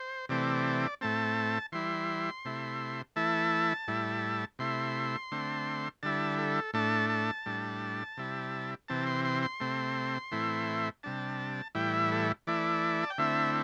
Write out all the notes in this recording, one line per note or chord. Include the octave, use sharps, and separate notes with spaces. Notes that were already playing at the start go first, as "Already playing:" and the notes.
Already playing: C5
C3 E3 A3 C4 D5
A2 A3 C4 A5
E3 G3 E4 C6
C3 A3 E4
E3 A3 E4 A5
A2 G3 E4
C3 A3 E4 C6
D3 A3 C4
D3 G3 E4 A5
A4
A2 A3 D4 A5
A5
A2 G3 D4
C3 G3 E4
C3 E3 C4 A5
C6
C6
C6
C3 A3 C4
A2 E3 A3 C4 E4
C3 G3 D4 A5
A2 E3 G3 E4 G5
E5
A4
E3 A3 E4 D5
A5
G5
D3 A3 C4 E4 E5